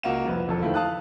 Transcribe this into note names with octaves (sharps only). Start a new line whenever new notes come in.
C#2 A#3 F#4 F5 F#5 E7
C2 F2 B4
E1 F2 A4
D#3 F3 A3 E4 F4
F5 A5 D#6 F#6